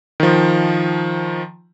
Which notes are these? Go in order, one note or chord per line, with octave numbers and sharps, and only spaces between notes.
D#3 F3